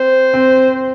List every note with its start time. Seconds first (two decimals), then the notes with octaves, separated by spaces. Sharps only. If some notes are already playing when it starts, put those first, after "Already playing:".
Already playing: C4 C5
0.34 C4